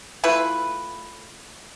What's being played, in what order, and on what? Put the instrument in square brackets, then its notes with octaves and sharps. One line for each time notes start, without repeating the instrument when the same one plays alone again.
[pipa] A3 E4 F4 B4